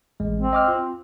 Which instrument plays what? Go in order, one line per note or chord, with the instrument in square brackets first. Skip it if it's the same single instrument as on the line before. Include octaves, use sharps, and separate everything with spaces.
[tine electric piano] A1 G#3
[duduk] C4
[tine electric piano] D#5 D6 F6
F4